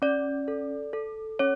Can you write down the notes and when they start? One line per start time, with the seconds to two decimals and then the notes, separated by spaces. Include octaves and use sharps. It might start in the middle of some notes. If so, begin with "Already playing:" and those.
0.02 C#4 D5
0.48 A4
0.93 A4
1.39 C#4 C#5